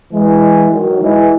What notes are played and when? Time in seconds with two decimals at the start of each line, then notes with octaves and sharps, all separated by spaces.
0.11 E3 G#3
0.71 D#3 F#3
1.01 E3 G#3